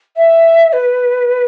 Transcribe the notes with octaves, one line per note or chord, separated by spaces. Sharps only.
E5
B4